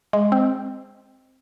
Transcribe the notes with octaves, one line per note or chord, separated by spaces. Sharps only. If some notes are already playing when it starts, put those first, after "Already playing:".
G#3
C4